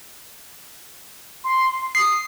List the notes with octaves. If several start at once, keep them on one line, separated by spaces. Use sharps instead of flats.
C6
D#6 C7